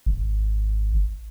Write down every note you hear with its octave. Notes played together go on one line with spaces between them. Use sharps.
G#1